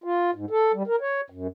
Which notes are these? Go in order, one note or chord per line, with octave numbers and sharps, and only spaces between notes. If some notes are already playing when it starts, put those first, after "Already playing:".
F4
G#2
A4
G3
A#4
C#5
F#2